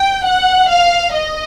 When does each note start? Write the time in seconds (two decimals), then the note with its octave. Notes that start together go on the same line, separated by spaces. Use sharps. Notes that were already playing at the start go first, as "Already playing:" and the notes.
Already playing: G5
0.25 F#5
0.70 F5
1.14 D#5